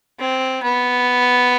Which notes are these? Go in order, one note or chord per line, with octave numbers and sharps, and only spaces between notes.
C4
B3